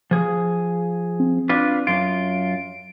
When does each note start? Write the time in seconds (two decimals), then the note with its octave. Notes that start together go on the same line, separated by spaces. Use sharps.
0.11 F3 G#4
1.20 C4
1.49 D4 F4 B4
1.87 F#2 F4 D7